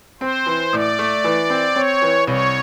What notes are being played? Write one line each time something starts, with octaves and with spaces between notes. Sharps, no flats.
C4 C5
E3
A2 D5
A3
E3
C4
C4 C#5
E3
C2 C#5